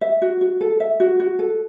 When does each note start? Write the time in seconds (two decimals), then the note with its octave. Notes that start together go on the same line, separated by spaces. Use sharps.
0.01 E5
0.22 F#4
0.41 F#4
0.61 A4
0.80 E5
1.00 F#4
1.20 F#4
1.39 A4